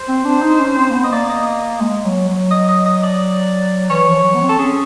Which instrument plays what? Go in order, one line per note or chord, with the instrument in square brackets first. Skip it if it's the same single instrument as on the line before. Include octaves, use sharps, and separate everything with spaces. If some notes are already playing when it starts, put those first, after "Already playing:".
Already playing: [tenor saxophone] C5
[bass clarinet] C4
D4
D#4
C#4
C4
A#3
B3
[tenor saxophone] D#5
[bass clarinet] A#3 [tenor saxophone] D5
[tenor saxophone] D#5
D#5
[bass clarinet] G#3
F#3
F#3
[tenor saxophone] D#5
D#5
D#5
D5
[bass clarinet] E3 [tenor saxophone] C#5
[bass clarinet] F3
F#3
B3
C4
[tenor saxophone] A4
[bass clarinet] C#4 [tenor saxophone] G#4